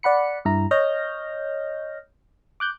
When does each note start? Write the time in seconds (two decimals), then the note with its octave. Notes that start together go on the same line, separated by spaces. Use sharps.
0.03 D5 F#5 B5 C#7
0.45 G2 E4 A#5
0.71 C#5 D#5 F6 G6 A#6
2.60 D6 F#6 G6